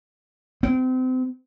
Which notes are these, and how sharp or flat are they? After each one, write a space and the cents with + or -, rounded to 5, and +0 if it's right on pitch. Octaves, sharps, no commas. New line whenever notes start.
C4 -35